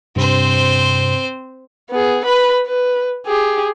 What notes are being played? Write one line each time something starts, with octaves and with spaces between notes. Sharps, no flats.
G2 C3 C4 C5
B3 G#4
B4 B5
B4
G4 G#4